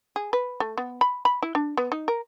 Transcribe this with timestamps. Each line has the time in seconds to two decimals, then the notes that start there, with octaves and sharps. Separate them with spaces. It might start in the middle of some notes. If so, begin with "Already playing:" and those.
0.16 G#4
0.33 B4
0.60 A3
0.77 B3
1.01 B5
1.25 B5
1.42 E4
1.55 D4
1.77 B3
1.92 D#4
2.08 A#4